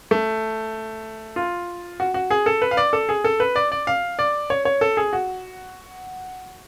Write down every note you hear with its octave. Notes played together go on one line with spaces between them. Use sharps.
A3
F4
F#4
F#4
G#4
A4
B4
F5
D5
A4
G#4
A4
B4
D5
D5
F5
D5
C#5
C#5
A4
G#4
F#4